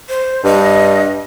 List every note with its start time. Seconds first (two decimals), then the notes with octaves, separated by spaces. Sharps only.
0.09 C5
0.44 G2 D#5